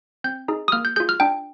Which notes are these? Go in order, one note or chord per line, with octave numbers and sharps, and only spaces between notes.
C4 G6
D#4 G#4
D#6
A#3 F6
G6
F4 G#4 G6
F6
D4 G5